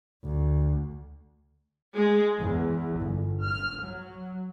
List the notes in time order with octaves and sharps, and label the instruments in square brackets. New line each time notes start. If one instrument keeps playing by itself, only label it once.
[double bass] D2
[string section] G#3
E2
G1
F6
F#3